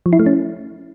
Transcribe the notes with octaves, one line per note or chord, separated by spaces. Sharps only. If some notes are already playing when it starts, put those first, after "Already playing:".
F3
E4
A3
C#4